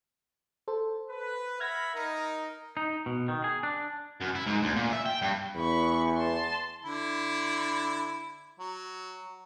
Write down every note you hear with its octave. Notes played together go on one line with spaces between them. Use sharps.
A4 C5
B4
E5 F#5 B5 F6 G#6 A#6
D#4 A#4
D#4
B2
D#3
G#4
D4
F#2
E4
G#2
D2
A#2
E5
G5
G2
E2 B5 C#6
A5 C6
D3 E4
F#3